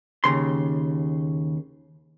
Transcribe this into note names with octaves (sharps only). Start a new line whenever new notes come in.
D#2 C#3 C6